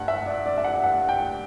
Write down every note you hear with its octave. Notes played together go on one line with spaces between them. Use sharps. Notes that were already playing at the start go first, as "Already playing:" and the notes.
Already playing: G2 F#5
E5
D5
D5
E5
F#5
F#5
G5